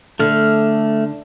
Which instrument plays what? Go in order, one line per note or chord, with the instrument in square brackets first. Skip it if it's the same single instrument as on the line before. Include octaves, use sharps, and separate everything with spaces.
[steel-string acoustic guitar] D3 [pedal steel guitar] A3 F6